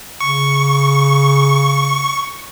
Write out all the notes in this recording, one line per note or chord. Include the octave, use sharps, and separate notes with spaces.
C#3 C#6